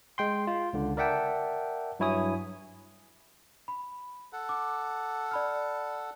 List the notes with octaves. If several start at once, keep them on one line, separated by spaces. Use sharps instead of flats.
G#3 G5 C6
F4
C#2 D3
A#4 D5 E5 F#5 G5 A5
G2 F#3 E4 C#5 G#5 D#6
B5
A4 F#5
D6
D5 B5 F6